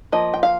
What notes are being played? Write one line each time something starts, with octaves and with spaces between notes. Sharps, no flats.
F3 A#3 D#5
G5
F5